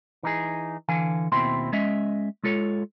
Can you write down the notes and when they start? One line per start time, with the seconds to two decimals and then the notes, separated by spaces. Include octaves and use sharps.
0.23 E3 D#4 G#4
0.89 D3 E3 F5 G#5
1.32 D#2 B2 C4 E4 C6
1.73 G#3 C#4 D#5 E5
2.44 G#3 F4 A4 C#5